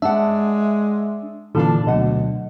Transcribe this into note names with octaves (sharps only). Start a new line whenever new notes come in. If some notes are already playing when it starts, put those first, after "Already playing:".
G#3 D4 E5 F#5
A#2 D3 E3 D4 F4 A4
D2 B2 F#3 D#5 F#5